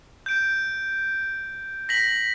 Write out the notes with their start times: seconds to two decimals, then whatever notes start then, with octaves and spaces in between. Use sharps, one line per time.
0.26 G6 D7
1.89 A#6 B6 F#7